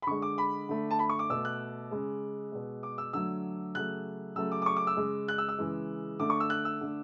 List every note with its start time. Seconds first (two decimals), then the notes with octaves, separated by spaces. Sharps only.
0.02 B5
0.07 D3 G#3 C#6
0.22 D6
0.38 B5
0.69 D3 A3
0.91 A5
0.99 B5
1.09 C#6
1.19 D6
1.30 B2 A3 E6
1.45 F#6
1.91 C#3 G#3
2.52 B2 G#3
2.83 D6
2.98 E6
3.13 D3 F#3 A3 E6
3.75 C#3 F#3 A3 F#6
4.36 C#3 F#3 A3 E6
4.52 D6
4.62 D6
4.66 C#6
4.76 D6
4.87 E6
4.97 C#3 G#3
5.28 F#6
5.38 E6
5.49 E6
5.59 C#3 E3 G#3
6.20 D3 A3 D6
6.30 C#6
6.40 E6
6.50 F#6
6.65 E6
6.81 D3 A3